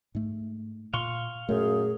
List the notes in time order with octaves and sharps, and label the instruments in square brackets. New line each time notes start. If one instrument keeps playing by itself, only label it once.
[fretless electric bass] G#2 A3
[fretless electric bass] A#2 [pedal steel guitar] F5 C6 C#6
[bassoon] F#2 [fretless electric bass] A#2 A3 [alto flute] G#4